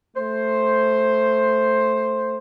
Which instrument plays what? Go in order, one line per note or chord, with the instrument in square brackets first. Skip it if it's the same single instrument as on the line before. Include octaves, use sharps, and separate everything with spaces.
[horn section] A3 C5